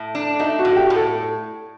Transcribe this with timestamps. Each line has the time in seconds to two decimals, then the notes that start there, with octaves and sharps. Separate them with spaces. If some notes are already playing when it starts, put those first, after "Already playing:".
Already playing: A2
0.15 D4
0.39 A3 D#4
0.59 F#4
0.65 A2
0.72 F#4
0.77 G4
0.90 A2
0.96 A4